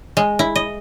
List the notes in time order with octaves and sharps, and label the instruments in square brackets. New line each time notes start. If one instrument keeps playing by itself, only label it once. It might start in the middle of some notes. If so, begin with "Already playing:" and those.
[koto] G#3
E4
D#5